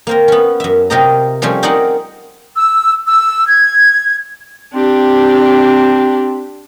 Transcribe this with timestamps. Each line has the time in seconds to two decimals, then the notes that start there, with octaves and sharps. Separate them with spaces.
0.07 A#3 C4 A#4
0.28 B3 C#4
0.60 F#2 E5
0.90 C3 F4 G4 A#4 D#5 A#5
1.42 F3 G3 A3 C4 C#4
1.63 C4 D#4 G#4 A#4 D5 F#5
2.55 E6
3.07 E6
3.47 G#6
4.74 C4 D4 G4